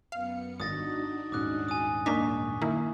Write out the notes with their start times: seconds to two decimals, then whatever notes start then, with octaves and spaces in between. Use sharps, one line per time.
0.12 F#2 B3 F5 C#7
0.60 G#1 D4 D#4 F#4 D#6 A6 A#6
1.32 D#1 G#2 C#4 D6 D#6 F#6
1.68 G#5 D#6
2.06 F#2 A#2 A#3 D4 D#4 C#6 D6 B6
2.61 D#3 A#3 E4